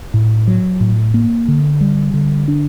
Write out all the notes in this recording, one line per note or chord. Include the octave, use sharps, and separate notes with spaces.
A2
F#3
A2
A#3
D3
G3
D3
D4